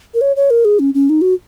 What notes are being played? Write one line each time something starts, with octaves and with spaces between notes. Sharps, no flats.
A#4
C#5
C#5
A#4
G#4
C#4
C#4
D#4
F#4